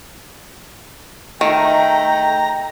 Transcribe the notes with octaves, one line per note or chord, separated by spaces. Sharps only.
D#3 A3 G5 A#5